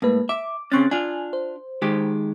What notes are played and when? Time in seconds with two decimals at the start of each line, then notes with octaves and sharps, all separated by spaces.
0.02 A2 G#3 A#3 B4
0.29 E5 D6
0.72 C#3 C4 C#4 C#6 F#6 A6
0.91 D4 F4 G#5
1.33 C5
1.82 D#3 G#3 G4